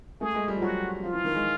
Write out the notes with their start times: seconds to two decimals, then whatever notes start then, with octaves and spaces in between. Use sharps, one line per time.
0.21 A3 G#4
0.35 G#3
0.48 G3
0.56 F3
0.62 F#3 F#4
1.04 F3 F4
1.13 E3
1.24 D#3
1.35 G#3